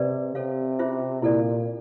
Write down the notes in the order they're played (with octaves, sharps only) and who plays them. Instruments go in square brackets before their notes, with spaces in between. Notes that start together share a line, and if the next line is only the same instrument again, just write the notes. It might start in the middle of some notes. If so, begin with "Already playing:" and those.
Already playing: [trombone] C3 [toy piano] G#4 B4 D5
[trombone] C3 [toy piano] A4 C#5 F5
[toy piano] C#4 F4 G#4 C5 E5
[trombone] A#2 [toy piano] E4 A4 D5